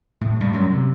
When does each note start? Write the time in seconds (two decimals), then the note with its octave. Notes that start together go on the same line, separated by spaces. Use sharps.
0.21 A2
0.41 G2 G3
0.53 F#2 F#3
0.71 C3